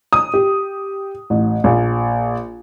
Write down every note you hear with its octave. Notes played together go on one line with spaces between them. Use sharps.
D#6
G4
A1
A#1